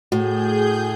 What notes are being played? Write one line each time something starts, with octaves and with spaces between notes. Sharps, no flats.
A2 F#4 G#4 G6